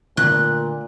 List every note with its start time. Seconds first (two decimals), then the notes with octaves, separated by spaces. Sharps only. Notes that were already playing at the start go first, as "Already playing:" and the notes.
0.17 A#2 D3 A3 B3 F#6